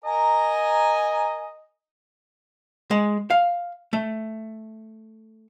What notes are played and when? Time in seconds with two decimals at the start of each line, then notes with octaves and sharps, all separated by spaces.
0.04 A#4 D#5 G#5 A#5
2.91 G#3
3.30 F5
3.93 A3